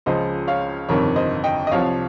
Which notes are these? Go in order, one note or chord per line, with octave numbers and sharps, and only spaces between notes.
C#2 C#3 F3 C5 D#5
C#5 F5
G1 F2 C3 D#3 A#4 C#5
C5 D#5
D#5 G5
D#5
C2 C3 F3 C#5 F5